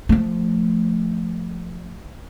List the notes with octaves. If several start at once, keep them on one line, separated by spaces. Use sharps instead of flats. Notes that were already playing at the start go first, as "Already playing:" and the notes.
F3 A3